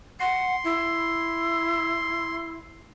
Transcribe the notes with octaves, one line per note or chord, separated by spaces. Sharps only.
F#5 C6
E4